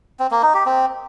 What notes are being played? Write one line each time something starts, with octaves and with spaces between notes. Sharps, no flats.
C4
A#3
D#4
G4
C4